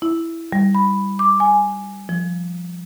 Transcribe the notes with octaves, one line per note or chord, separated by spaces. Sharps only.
E4
G3
B5
D6
G#5
F3